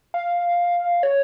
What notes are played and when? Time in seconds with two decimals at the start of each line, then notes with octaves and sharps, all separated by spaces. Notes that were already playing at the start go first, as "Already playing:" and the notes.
0.14 F5
1.03 C#5